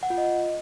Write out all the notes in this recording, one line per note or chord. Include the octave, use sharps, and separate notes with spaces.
F#5
F4
D#5